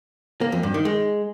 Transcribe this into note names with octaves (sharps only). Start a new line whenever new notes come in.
A#3
F2
G2
D#3
G#3